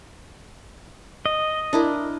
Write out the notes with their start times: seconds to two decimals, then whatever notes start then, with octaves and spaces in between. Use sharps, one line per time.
1.26 D#5
1.73 D4 E4 A#4